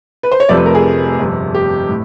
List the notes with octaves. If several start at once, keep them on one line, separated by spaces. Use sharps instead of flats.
B4
C5
C#5
F1 F2 C3 F3 A3 D5
B4
A#4
G#4
G1 F2 C3
G4
A2